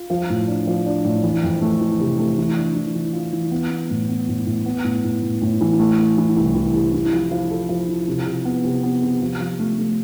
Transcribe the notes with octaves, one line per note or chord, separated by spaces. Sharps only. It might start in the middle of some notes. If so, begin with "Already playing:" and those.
Already playing: F4
F3
A2
D4
F3
D4
A2
E3
F2
A3
E3
C3
A3
E3
D4
E3
E3
F4
E3
B3
B3
A2
B3
A2
A2
B3
A2
A2
A2
A2
E3
A3
A3
E3
C2
E3
C3
E4
F3
F3
A4
F3
E4
C3
C3
B3
C3
B3
C3
F3
F3
A3
A3